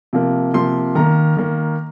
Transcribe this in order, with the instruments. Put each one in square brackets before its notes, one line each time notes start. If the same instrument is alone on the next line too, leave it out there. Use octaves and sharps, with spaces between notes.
[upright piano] C3 F3 A#3
C3 F3 A#3 C6
D#3 A#3 A#5
D#3 A#3